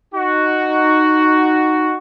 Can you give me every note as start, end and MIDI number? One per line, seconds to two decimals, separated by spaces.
0.14 1.97 63
0.14 1.97 66